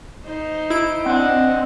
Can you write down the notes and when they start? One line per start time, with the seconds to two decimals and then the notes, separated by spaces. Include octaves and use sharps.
0.25 D#4 C5
0.70 E4 D7
1.06 C4 D4 D#5 F#5